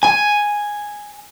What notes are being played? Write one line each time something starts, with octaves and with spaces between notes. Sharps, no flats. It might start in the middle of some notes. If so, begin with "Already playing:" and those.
G#5